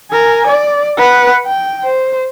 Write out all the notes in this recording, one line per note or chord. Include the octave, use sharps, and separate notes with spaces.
A#4 G#5
D5
B4 F#5
G5
C5